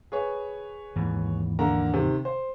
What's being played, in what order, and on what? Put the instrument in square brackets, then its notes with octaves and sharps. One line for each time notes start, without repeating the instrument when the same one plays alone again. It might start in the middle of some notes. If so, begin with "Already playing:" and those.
[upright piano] G#4 B4 C#5
[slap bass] D#2 G#2 E3
[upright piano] D3 A#3 A#5
C3 D#3
C5